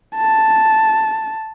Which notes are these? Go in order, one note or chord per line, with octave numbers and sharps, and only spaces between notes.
A5